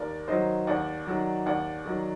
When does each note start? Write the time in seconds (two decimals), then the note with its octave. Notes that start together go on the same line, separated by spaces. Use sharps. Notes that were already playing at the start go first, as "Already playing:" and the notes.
Already playing: D#2 A#4 D5
0.28 D#3 F#3 C5 D#5
0.67 D#2 D5 F#5
1.07 D#3 F#3
1.46 D#2 D5 F#5
1.86 D#3 F#3